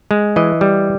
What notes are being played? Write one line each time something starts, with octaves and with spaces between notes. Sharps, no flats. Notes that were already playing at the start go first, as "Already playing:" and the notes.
G#3
E3 D#5
G3